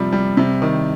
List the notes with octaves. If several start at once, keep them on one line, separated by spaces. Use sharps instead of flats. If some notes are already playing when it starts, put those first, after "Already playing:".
Already playing: C3 F3 G3
G3
C3
D#3